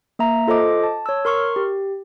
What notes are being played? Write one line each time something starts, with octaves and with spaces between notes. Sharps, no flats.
A#3 E5 A#5
F4 A4 C5 D#5 D6
A5
C#5 E6
A#4 C6 C#6 F6
G4